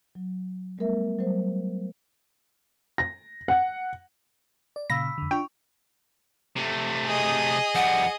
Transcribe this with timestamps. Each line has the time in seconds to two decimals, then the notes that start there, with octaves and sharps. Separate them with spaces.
0.15 F#3
0.78 G3 A3 B3 A#4 E5
1.19 F#3 G3 C5
2.98 A#6
3.48 F#5
4.76 D5
4.90 A#2 C#3 F5 B5 E6 A#6 B6
5.18 F2 D3
5.31 D4 F4 G5 C#6
6.56 C3 A3
7.05 G#4 D#5
7.75 F2 G3 F#5